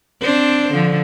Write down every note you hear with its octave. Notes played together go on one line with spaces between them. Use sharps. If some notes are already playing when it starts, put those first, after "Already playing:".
C4 D4 C5
D3 F3